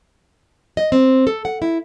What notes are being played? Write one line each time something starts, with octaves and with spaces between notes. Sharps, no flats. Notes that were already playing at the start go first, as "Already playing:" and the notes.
D#5
C4
A4
F#5
E4